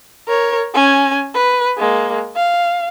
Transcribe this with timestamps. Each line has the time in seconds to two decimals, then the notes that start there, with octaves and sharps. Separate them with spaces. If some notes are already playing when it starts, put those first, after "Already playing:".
0.28 A#4 C#5
0.74 C#4 G#5
1.34 B4
1.78 G#3 A#3
2.36 F5